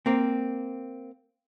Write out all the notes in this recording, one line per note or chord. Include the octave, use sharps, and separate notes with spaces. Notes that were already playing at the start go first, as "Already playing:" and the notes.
A#3 C4